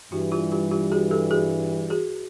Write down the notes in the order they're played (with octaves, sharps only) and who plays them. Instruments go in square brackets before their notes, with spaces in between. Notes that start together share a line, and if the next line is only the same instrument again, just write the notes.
[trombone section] G2 E3 G3 [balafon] E4 F#4
[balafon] F4 G4
F4 G4
F4 G4
F#4 G#4
G4 A4
F#4 G#4
F#4 G#4